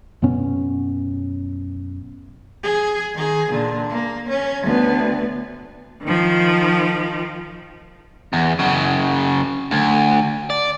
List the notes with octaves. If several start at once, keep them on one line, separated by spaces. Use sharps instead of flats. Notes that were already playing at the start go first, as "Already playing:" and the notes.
F#2 B2 B3 C#4
G#4
D#3 G#4
A#2 D3
A#3
C#4
D2 B3
D#3 F3
E2
F#2 C#3
D2
D5